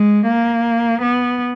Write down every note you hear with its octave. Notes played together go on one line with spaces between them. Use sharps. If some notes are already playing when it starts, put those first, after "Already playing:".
Already playing: G#3
A#3
B3